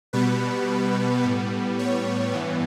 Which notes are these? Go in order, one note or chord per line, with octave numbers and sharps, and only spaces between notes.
B2 G3 B3 B4
A2 G3 B3
C#5
G2 E3 B3